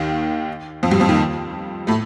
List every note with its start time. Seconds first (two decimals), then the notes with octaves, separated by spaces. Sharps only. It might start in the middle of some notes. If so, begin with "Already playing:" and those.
Already playing: D#2 D#3
0.83 F2 F3
0.91 G2 G3
1.00 F2 F3
1.09 D#2 D#3
1.87 A2 A3